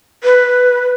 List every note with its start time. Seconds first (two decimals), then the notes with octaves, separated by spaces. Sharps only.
0.24 B4